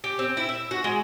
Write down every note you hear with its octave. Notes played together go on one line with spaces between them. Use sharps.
G4
C4
E4
E5
F#4
G#3